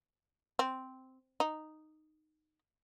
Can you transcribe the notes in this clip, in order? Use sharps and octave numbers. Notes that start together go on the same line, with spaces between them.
C4
D#4